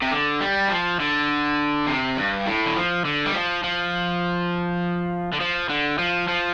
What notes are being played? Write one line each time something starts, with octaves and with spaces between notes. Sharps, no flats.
C3
D3
G3
F3
D3
C3
G2
A2
D3
F3
D3
G3
F3
F3
D3
F3
D3
F3
F3